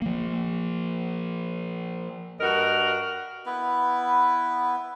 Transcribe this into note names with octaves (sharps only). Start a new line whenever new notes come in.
F3 A#3
G2 F#4 A#4 D#5
B3 E4 B4